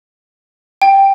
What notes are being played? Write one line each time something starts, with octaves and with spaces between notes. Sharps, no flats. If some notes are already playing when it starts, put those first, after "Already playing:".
G5